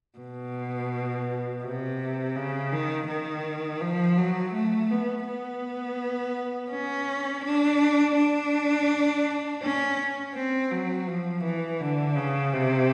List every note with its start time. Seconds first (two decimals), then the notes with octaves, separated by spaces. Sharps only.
0.19 B2
1.64 C3
2.36 C#3
2.72 D#3
3.08 D#3
3.81 F3
4.17 F#3
4.53 A3
4.91 B3
5.27 B3
6.72 C#4
7.45 D4
8.17 D4
9.62 C#4
10.35 C4
10.71 F#3
11.07 F3
11.44 E3
11.81 D3
12.16 C#3
12.53 C3